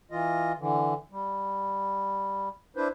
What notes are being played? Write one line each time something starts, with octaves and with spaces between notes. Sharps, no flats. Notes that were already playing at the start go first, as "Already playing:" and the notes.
E3 F4 D#5
D3 E3
G3
D4 E4 B4 C5